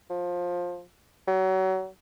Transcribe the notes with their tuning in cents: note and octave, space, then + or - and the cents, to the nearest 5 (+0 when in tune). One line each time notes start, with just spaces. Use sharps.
F3 +20
F#3 +30